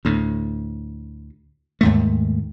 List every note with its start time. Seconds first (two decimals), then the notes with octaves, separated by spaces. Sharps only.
0.05 D2 A2
1.81 D#2 G#2 A3